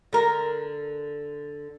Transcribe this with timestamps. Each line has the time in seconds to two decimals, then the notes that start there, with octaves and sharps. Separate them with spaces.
0.13 D3 A#4